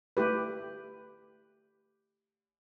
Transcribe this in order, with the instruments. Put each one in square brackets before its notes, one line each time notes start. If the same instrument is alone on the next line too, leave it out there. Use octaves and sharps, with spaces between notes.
[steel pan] A3 E4 G4 B4